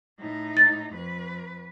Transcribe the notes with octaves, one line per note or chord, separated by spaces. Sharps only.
A2 D#4
A6
F2 B4